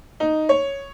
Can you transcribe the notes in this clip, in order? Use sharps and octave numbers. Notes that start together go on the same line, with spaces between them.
D#4
C#5